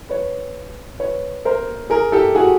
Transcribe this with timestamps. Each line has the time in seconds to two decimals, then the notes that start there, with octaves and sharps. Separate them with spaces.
0.09 B4 C#5
1.00 B4 C#5
1.45 A#4 C5
1.90 G#4 A#4
2.12 G4 A4
2.35 F#4 G#4